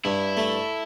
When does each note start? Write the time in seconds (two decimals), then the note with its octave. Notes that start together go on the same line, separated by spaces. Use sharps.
0.05 G2 E4
0.37 A3